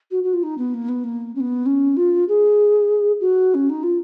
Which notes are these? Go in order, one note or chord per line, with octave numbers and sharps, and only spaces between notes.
F#4
F#4
F4
D#4
B3
A#3
B3
A#3
C#4
B3
C#4
F4
G#4
F#4
C#4
D#4
F4